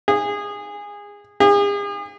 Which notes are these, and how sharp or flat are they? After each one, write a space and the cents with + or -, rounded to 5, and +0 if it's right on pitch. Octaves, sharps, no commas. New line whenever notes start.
G#4 -20
G#4 -40